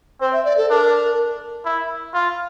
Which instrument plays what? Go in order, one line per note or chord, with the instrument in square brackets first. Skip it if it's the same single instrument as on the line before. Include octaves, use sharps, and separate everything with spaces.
[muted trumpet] C4 [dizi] C5
[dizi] E5
D5
A4
[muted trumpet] D4 [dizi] A#4
[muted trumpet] E4
F4